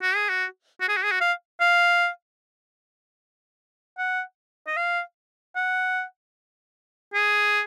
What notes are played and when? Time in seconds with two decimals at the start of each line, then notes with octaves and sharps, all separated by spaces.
0.02 F#4
0.16 G#4
0.29 F#4
0.81 F#4
0.89 G#4
0.97 F#4
1.04 G#4
1.11 F#4
1.21 F5
1.61 F5
3.98 F#5
4.67 D#5
4.77 F5
5.56 F#5
7.14 G#4